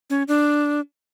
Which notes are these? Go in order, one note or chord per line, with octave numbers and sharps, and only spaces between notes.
C#4
D4